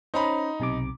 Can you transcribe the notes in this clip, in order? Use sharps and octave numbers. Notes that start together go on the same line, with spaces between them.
C#4 D#4 C5 A#5 B5
B1 C3 D6